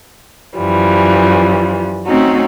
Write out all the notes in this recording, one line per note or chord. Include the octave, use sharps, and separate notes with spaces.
F#2 E3 F3 G3
A3 C4 C#4 D#4 F#4